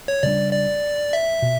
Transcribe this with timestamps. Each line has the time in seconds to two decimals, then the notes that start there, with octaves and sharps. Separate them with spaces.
0.08 C#5
0.23 C#3 G3 D4 D5
0.53 D5
1.13 E5
1.42 B2